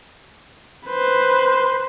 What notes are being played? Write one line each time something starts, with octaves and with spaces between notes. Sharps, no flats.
B4 C5